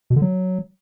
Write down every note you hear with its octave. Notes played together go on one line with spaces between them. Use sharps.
B2
D3
F#3